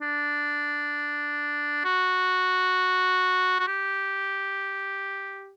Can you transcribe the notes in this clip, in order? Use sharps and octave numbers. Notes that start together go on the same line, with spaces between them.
D4
F#4
F#4
G4